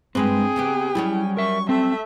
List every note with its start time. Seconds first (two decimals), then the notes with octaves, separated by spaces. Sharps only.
0.15 G2 G#3 C4 G#4 B4 G5
0.56 C#3 B3 G4
0.95 F#3 G3 C#4 E4
1.37 A#4 E5 C#6
1.69 A3 C4 E5